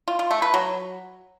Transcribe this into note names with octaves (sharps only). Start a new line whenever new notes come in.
F4
F4
A3
B4
F#3